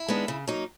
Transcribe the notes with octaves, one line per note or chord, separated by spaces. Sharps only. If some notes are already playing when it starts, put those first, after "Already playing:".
Already playing: E4
D#3 G#3 B3 D4
C#3
F#3 A#3 D#4